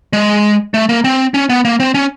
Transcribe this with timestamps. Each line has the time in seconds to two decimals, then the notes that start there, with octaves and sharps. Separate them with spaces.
0.13 G#3
0.74 A3
0.89 A#3
1.04 C4
1.34 C#4
1.50 B3
1.65 A#3
1.80 C4
1.94 C#4